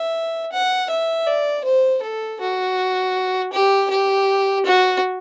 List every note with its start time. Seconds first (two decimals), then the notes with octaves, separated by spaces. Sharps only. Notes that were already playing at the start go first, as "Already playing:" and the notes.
Already playing: E5
0.52 F#5
0.90 E5
1.26 D5
1.64 C5
2.02 A4
2.40 F#4
3.53 G4
3.90 G4
4.65 F#4